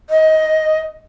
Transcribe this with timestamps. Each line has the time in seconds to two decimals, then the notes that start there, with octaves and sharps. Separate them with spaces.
0.10 D#5